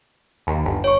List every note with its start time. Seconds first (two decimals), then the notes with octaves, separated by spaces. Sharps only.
0.47 D#2
0.65 G1
0.84 C#5 C#6